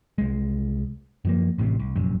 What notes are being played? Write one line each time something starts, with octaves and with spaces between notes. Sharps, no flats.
C2 G#3
F#2 F3 A#3
A1 A2 C3
C2
F1 A#1 F#2